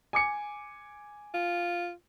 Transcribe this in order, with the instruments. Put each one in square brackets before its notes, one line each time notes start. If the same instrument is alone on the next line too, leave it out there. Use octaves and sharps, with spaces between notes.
[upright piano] G#5 D6 C#7
[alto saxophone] F4